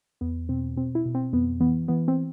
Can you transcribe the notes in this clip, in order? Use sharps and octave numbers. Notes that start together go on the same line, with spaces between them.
E2 B3
B2 C4
B2 C4
E4
B2
C4
F2 B3
E3 B3
E3 B3
C4